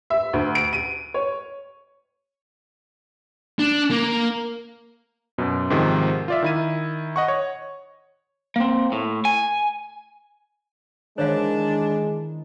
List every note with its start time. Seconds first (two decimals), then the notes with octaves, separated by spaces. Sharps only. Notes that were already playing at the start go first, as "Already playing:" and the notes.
0.10 E5
0.33 D2
0.55 D7
0.73 D#7
1.14 C#5
3.59 D4
3.90 A#3
5.38 F#2 B2
5.70 G#2 C3 D#3 F3
6.28 F4 D5 E5
6.42 D#3 E4 D#7
7.16 D#5 F#5 C#6
7.28 C#5
8.56 A#3 C4
8.92 A2
9.25 G#5
11.18 D#3 E3 G#3 D4 C5 C#5 F5